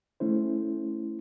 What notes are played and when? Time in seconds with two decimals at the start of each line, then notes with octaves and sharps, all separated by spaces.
0.20 A3 C#4 E4 C5